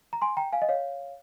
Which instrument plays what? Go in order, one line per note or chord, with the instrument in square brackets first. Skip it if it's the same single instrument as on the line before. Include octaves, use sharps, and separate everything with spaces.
[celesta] A#5
G#5 C6
G5 A#5
F5 G#5
D#5
C#5 F5